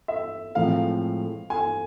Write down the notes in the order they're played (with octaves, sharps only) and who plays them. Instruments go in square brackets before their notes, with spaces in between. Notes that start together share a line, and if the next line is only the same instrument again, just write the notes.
[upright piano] E5
[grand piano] A2 F3 G#3 C4 [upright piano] F5
[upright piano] G#5